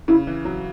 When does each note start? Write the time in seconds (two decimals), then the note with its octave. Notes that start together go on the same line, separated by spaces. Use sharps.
0.08 C#3 E4
0.27 E3
0.45 F#3